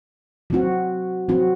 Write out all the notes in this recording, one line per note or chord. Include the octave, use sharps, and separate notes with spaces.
F#3 C4 F#4
F#3 C4 F#4